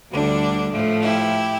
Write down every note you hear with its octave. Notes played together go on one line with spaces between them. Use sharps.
D2 D3 G3 D4
A2 F3 A3
E4 G4